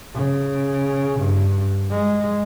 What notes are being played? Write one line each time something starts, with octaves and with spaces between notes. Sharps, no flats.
C#3
G2
G#3